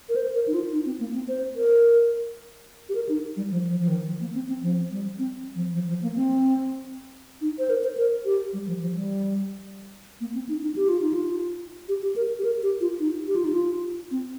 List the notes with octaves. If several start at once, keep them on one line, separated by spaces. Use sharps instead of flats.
A#4
C5
A#4
D#4
F4
D#4
C4
A#3
C4
C5
A#4
G4
A#4
D#4
G3
F3
F3
F3
D#3
F3
A#3
C4
C4
F3
G3
C4
F3
F3
F3
A#3
C4
D#4
C5
A#4
C5
A#4
G4
G3
F3
F3
G3
A#3
C4
D#4
D#4
G4
F4
D#4
F4
G4
G4
A#4
G4
A#4
G4
F4
D#4
G4
F4
D#4
F4
C4